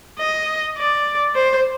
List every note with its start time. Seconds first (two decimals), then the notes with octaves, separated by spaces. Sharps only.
0.19 D#5
0.77 D5
1.35 C5